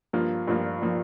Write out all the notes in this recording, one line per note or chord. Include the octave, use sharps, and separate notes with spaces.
G2 F3 A#3 F4
G2 F3 A#3 F4
F3 A#3 F4